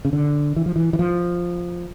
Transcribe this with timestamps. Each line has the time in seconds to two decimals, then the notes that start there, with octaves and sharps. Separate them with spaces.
0.05 C#3
0.13 D3
0.56 E3
0.66 F3
0.76 E3
0.93 E3
0.99 F3